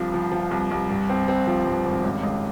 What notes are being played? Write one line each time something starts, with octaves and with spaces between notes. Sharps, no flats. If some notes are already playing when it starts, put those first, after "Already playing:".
Already playing: C2 G2 F3
F3
F3
C2
C2
G2
C4
C4
F3
G2
G#1
C#2
C#2